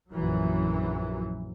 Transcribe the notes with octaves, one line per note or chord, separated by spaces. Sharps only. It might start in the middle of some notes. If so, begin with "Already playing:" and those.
A#1 F#2 E3 F#3